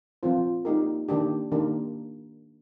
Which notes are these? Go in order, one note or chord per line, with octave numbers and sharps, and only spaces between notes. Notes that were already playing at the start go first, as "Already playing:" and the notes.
F3 C4 F4 C5
A#3 D#4 G4 A#4
D#3 A#3 D4 G4
D#3 A#3 D4 G4 A#4